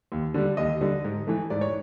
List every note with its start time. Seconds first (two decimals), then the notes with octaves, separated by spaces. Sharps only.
0.12 D#2
0.34 D3 G3
0.57 D#2 D#5
0.81 D3 G3
1.05 G#2
1.27 E3 A3
1.50 G#2 D5
1.61 C#5